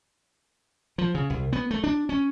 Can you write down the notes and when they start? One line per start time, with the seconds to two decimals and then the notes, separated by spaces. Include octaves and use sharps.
0.98 F3
1.15 C#3
1.30 C2
1.53 B3
1.71 A3
1.84 D4
2.09 C#4